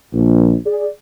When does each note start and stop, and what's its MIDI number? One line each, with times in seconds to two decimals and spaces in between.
0.13 0.55 34
0.66 0.86 68
0.66 0.86 74